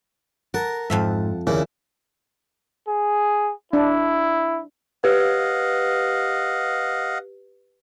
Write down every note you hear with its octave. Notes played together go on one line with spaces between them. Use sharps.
A#4 F#5 A5
F2 G#2 F3 E5
D#2 A#2 C#3 E4
G#4
D4 E4
G4 B4 D#5 F5 F#5